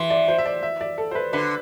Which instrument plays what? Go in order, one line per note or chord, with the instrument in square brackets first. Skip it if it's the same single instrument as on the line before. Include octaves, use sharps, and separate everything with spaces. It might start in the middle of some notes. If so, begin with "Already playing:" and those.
Already playing: [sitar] E3 [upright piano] C6
[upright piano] D5
C5
E5
D5
E5
D5
A4
C5
B4
[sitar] D3 [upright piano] B4